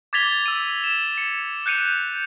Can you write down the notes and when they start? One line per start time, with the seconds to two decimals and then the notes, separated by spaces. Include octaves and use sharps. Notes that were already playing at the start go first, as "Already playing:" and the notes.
0.13 D6 G#6 A6 B6 F7 G7
0.46 E6 D#7
0.84 E7
1.18 C#7 E7
1.66 F#6 G6 C#7 D#7 F7